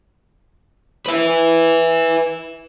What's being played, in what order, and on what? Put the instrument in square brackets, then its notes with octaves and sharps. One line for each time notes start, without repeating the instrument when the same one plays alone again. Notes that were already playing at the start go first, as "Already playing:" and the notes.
[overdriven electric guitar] B4 E5